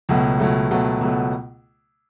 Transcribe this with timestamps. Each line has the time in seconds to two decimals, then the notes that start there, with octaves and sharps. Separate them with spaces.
0.09 C#2 B2 F#3 A3
0.40 C#2 B2 F#3 A3
0.71 C#2 B2 F#3 A3
1.01 C#2 B2 F#3 A3